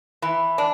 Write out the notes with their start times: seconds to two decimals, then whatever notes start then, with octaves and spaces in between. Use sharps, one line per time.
0.22 E3 B5
0.58 D4